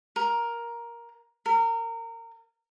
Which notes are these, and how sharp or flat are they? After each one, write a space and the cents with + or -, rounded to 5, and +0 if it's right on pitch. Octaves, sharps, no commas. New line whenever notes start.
A#4 +10
A#4 -25